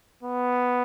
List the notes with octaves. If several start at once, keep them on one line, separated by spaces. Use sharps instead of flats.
B3